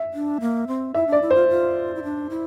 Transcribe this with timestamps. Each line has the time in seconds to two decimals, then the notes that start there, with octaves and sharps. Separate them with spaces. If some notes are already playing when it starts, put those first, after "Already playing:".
Already playing: E5
0.14 D4
0.41 A#3
0.68 C4
0.94 E4 E5
1.07 D4
1.12 D5
1.22 E4
1.31 F4 C5
1.49 F4
1.95 E4
2.03 D4
2.30 E4